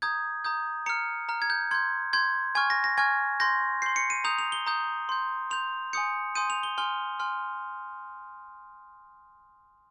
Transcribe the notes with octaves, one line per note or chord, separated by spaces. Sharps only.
A#5 D#6 G6 G#6
A#5 D#6 G6
A#5 F6 C#7
A#5 F6
G#6
G6
C6 G6 G#6
C6 G6 G#6
G#5 C#6 F6 G#6
A#6
A#6
G#5 C#6 F6 G#6
C6 G6 A#6
C6 G6 C7
C#7
D#7
A#5 D#6 G6 F7
F7
G7
A#5 D#6 G6
C6 G6
C6 G6 F7
G#5 C6 D#6 G6 C#7
G#5 C6 D#6 G6 D#7
F7
G7
G#5 C6 F6 G7
G#5 C6 F6